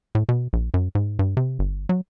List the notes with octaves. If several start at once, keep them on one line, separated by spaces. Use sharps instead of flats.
A2
B2
A#1
F#2
G#2
G2
C3
G1
F#3